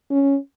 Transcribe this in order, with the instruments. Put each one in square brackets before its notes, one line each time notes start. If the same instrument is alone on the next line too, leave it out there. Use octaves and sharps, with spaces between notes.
[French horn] C#4